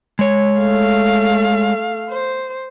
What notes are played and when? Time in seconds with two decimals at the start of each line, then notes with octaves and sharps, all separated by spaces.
0.19 G#3 C#5
0.59 A3 F5
2.10 C5